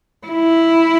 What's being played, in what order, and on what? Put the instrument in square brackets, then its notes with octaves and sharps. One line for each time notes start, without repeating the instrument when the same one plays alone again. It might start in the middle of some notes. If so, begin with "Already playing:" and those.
[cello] E4